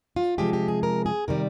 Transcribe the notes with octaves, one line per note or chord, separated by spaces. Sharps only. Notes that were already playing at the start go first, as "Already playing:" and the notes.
F4
C3 F3 G#3 G4
G4
G#4
A#4
G#4
C3 D#3 G3 A#4